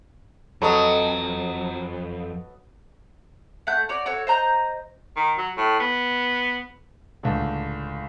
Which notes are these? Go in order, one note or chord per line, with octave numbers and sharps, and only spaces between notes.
F2 F#3 A4 B4 D#5 F#5 C#6 D#6
A3 F#5 G6
F#4 C#5 D5
F#4 A4 C#5
C5 D#5 A#5 G6
D#3
F#3
A2
B3
C#2 A2 D3